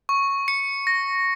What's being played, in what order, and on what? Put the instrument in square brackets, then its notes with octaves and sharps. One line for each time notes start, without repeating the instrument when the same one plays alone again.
[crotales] C#6
C#7
A#6